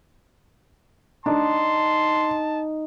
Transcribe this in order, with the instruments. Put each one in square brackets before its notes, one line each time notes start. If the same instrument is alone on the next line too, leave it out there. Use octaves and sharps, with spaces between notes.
[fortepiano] D4 [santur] D#4 [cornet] A5 [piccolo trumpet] C6